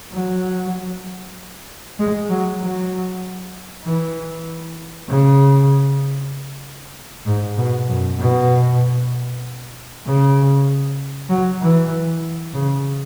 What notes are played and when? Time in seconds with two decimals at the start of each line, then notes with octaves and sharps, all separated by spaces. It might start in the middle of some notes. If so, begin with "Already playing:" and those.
0.12 F#3
1.99 G#3
2.29 F#3
2.61 F#3
3.84 E3
5.09 C#3
7.26 G#2
7.57 B2
7.89 F#2
8.19 B2
10.06 C#3
11.29 F#3
11.61 E3
12.54 C#3